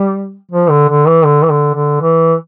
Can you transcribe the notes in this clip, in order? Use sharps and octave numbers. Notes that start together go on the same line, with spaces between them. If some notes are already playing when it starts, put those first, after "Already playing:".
Already playing: G3
F3
D3
D3
E3
D3
E3
D3
D3
E3